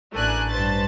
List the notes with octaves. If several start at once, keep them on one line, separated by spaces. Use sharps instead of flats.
A1 A3 D4 A#4 G#5 F#6
G2 B4 C5 A5 A6